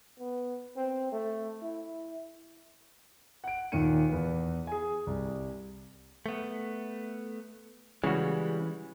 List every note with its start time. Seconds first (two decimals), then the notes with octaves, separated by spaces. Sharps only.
0.19 B3
0.77 C4
1.12 A3
1.62 E4
3.44 F#5 D7
3.72 D#2 A#2 D#3 C#7 D#7
4.10 E2 B4
4.67 G#4 G#5
5.07 C2
6.26 A3 B3
8.04 C#3 E3 G3 G#3 F#4